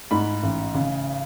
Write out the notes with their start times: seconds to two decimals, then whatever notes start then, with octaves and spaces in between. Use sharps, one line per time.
0.11 G#2 B5
0.43 A1
0.74 C#3